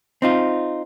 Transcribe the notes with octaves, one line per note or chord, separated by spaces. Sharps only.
C4 D#4 F4